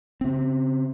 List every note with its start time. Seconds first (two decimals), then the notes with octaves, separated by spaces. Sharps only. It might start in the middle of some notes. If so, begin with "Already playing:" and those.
0.21 C#3 C4